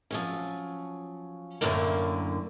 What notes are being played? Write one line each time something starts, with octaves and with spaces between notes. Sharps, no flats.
F3 F#3 C#4
F#2 A2 D3 F#3 A#3